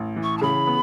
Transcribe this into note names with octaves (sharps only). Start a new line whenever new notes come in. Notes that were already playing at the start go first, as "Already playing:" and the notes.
Already playing: A1
E3
C#6
A5
C#3 B5
B3